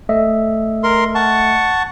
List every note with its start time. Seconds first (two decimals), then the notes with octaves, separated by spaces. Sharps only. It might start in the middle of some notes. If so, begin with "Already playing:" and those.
0.09 A3 D#5 E5
0.84 A#4 C6
1.15 F#5 A5 C#6